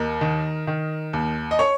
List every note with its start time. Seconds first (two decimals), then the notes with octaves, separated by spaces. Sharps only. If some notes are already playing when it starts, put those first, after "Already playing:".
Already playing: D#2 A#4 D#5
0.21 D#3
0.67 D#3
1.13 D#2
1.51 D#5
1.59 C#5